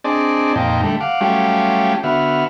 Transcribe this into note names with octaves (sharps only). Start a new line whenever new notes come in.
C4 D4 G#4 D5 D#5 A5
F2 A#2 D#4 G5
D3 G3 A3
F5 F#5 D6
F#3 G3 A3 C#4 F4 G4
D3 B3 F#4 E5 F6